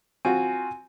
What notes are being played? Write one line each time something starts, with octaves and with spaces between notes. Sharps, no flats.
C4 F4 F#4 G#5